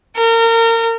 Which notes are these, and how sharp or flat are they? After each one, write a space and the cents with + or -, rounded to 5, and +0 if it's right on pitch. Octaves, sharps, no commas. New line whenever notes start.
A#4 -30